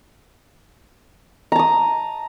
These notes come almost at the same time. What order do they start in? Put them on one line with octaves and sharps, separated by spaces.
A#5 A5 D#6